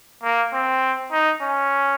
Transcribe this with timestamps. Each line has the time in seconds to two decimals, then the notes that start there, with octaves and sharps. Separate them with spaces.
0.23 A#3
0.53 C4
1.12 D#4
1.42 C#4